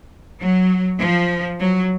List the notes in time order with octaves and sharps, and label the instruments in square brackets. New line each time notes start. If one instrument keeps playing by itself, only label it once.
[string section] F#3
F3
F#3